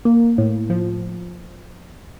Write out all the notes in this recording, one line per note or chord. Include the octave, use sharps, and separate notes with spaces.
A#3
A2
F3